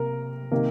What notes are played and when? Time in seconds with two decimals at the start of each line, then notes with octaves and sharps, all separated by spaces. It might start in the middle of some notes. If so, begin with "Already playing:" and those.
Already playing: C3 A#3 A#4
0.51 C3 D#3 A#3